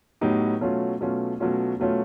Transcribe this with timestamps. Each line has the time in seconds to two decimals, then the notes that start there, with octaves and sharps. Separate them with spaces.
0.21 A2 F#3 B3 D#4 G4
0.61 B2 F#3 A3 C#4 F4
1.01 B2 F#3 A3 C#4 F4
1.40 B2 F#3 A3 C#4 F4
1.79 B2 F#3 A3 C#4 F4